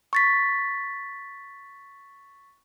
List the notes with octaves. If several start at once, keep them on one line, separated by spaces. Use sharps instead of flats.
C#6 A6 B6